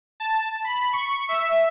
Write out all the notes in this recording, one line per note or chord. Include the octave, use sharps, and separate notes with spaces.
A5
B5
C#6
E5